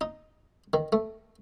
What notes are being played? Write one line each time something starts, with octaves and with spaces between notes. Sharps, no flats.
D#4
D#3
A3